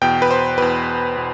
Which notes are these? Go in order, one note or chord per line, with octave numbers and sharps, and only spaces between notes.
E2 B2 G5
B4
C5
E2 B2 B4
B2